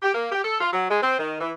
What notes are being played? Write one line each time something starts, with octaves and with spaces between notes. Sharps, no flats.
G4
A#3
G4
A4
F4
F#3
G#3
C4
D#3
E3